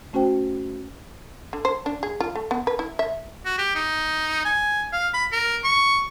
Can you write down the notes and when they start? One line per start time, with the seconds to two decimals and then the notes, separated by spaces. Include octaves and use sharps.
0.13 A3 C#4 F#4 C5 G5
1.53 D3
1.65 C5
1.86 D4
2.03 G#4
2.20 F4
2.35 A3
2.51 B3
2.67 B4
2.79 E4
2.99 E5
3.45 F#4
3.58 G4
3.75 D#4
4.45 G#5
4.92 F5
5.14 B5
5.32 A#4
5.64 C#6